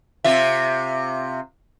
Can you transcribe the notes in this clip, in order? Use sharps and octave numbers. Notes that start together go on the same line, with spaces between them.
C3 F4 E5